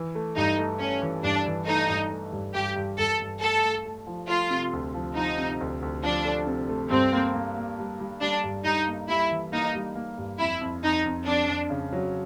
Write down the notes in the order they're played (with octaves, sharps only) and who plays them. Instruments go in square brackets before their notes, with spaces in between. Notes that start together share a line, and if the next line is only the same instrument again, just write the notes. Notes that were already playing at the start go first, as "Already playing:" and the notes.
Already playing: [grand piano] E3
A3
[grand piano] G2 [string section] D#4
[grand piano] A3
[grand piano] A3 [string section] C#4
[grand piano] E3
[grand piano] G2 [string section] D4
[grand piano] E3
[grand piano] A3 [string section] D#4
[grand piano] G2
A3
G2
[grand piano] G2 [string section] G4
[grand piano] G2
[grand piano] G2 [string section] A4
[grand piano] G2
[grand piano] A3 [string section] A4
[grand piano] A3
A3
F3
[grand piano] A3 [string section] F4
[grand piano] C3
D2
F3
[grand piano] F3 [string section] D#4
[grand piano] C3
D2
D2
[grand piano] F3 [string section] D4
[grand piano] A3
C3
A3
[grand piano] G2 [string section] C4
[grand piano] A#3
A#3
A#3
G3
G3
[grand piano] G3 [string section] D4
[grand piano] G2
[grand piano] G3 [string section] D#4
[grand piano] A#3
[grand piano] G3 [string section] E4
[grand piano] E3
[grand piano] A#3 [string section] D#4
[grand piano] G3
A#3
G2
[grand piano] F2 [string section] E4
[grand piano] F2
[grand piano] F2 [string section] D#4
[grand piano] F2
[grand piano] F2 [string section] D4
[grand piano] F2
C#3
F#3